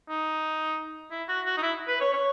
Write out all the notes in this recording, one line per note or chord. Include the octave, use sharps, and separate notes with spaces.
D#4
E4
F#4
F#4
D#4
E4
B4
C#5
C#5